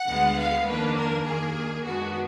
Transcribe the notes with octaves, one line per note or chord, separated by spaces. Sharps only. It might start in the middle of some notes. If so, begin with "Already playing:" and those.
Already playing: F#5
D2 D3 G#3 B3
F5
F2 D#3 A#3 D4 B4
A#4
D#2 D#3 A#3 G#4
F#2 D#3 G#3 B3 D4 F#4